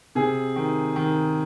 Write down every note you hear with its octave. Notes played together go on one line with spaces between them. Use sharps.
C3 G#4
D#3
D#3